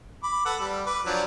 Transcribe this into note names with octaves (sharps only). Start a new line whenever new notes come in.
B5 D6
A4 B4 F#5
G3
B4 D6
F3 F#3 D4